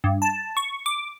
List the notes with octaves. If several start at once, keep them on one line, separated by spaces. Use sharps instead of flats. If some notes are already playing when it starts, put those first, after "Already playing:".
G2
A5
C#6
D6